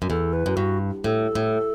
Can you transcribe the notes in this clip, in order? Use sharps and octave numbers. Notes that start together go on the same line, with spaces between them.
F#2
E2 A4
B4
F#2
G2 F#4
A2 A4
A2